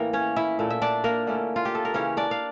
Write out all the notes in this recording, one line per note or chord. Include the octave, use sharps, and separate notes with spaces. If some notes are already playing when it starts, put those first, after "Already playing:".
Already playing: A2 E3 A#3 A#4
C#4 C#5
E4 E5
A#2 A3 E4
E5
D4 D5
A#3 A#4
D3 A3 C#4 E4
F4
G4
A4
A#4
C#3 E3 A#3 C#4 E4 C#5
D4 D5
F5